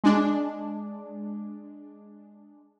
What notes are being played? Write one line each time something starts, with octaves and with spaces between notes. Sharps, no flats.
G#3 D4